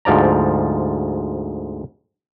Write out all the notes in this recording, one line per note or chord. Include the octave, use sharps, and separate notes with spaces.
D2 G#2 F3 D5 A#5